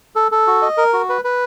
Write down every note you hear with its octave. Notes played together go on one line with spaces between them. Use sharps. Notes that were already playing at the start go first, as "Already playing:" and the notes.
A4
A4
F#4
D#5
A#4
F#4
B4
B4